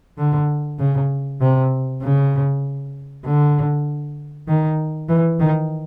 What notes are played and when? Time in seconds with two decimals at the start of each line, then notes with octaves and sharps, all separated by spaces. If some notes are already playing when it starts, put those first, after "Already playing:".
0.18 D3
0.79 C#3
1.41 C3
2.02 C#3
3.25 D3
4.48 D#3
5.09 E3
5.39 D#3